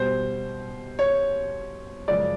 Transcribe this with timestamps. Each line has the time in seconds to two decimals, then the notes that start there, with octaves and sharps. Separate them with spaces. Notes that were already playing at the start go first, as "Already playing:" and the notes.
Already playing: B2 G3 C5
0.99 C#5
2.08 F#2 C#3 F3 G#3 D5